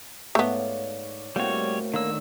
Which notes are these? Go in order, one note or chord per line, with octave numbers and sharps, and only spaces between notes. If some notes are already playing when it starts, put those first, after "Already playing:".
G#2 A3 B3 C#5 D5 F5
A2 G3 A#3 C4 F#4 C#5
D3 D#3 A#3 C#5 E6